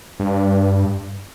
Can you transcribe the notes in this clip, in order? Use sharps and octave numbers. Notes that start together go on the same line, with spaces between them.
G2